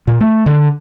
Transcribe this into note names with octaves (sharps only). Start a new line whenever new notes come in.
A#2
A3
D3